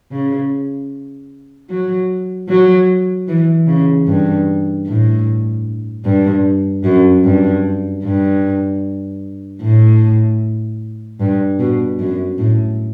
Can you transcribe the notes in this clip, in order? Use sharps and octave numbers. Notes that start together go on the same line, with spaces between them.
C#3
F#3
F#3
E3
C#3
G2
A2
G2
F#2
G2
G2
A2
G2
B2
F#2
A2